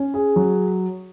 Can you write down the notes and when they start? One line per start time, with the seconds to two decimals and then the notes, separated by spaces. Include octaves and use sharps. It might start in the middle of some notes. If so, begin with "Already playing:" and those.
Already playing: C#4
0.14 G#4
0.36 F#3